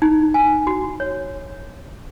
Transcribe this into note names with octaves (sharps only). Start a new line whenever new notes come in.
D#4
G#5
F#4
C#5